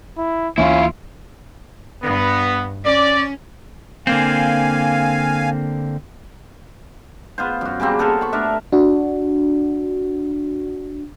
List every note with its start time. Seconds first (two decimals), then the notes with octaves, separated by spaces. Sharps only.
0.18 E4
0.58 D2 E3 A#3 C#4 E4 F4
2.03 G2 B3
2.84 C#4 D5
4.07 D3 A#3 C4 F5 G#5
7.38 B3 F4 C5
7.61 F#2 F#4
7.80 C#3 G3 A#3 C4
7.99 B3 A4 A#4 C5
8.21 B5 C#6
8.33 A3 D4 A#4 E5
8.72 D4 F#4